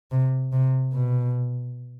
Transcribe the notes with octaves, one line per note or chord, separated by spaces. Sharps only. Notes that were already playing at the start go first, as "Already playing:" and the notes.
C3
C3
B2